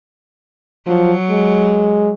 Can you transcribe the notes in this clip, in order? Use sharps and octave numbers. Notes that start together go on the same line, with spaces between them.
F3 F#3
G#3